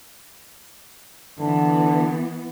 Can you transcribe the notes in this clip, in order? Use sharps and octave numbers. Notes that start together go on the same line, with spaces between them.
D3 E3 B3